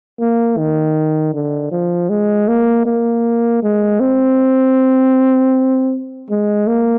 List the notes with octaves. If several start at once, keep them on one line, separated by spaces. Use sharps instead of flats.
A#3
D#3
D3
F3
G#3
A#3
A#3
G#3
C4
G#3
A#3